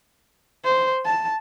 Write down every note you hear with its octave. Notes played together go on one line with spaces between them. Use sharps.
C5
A5